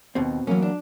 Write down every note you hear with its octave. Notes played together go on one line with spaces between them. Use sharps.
D#2 B2 C4
A2 E3 F#3 A#3 C#4
D4